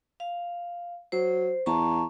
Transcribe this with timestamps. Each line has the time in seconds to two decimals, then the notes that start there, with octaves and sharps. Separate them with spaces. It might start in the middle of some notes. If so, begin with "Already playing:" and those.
0.20 F5
1.12 F#3 C5
1.66 E2 A5 A#5 C#6